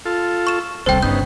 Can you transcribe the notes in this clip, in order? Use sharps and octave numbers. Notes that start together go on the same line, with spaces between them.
F4 A4
C#6 E7
D#1 C2 G3 C4 A4 C5 G5
G1 G2 C#3 B3 D#4 G6